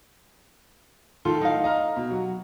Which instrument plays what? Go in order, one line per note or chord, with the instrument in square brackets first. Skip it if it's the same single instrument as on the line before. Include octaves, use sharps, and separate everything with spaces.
[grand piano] A2 D#3 A4 [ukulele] F4
[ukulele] D#4 F5
[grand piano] D#5 A#5 F6
B2
F#3 F#4